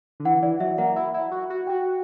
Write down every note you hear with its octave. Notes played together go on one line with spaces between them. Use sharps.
D3
E3 F#5
E3 D5
F#3 E5
A#3 F#5
E4
E4
F#4
F#4
F#4 G5